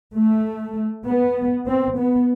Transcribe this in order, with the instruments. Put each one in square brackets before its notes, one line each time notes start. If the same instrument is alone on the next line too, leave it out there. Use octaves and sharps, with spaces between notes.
[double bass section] A3
B3
C4
B3